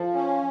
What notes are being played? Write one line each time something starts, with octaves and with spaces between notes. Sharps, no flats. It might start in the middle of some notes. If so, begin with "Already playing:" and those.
Already playing: F3 A4
C#4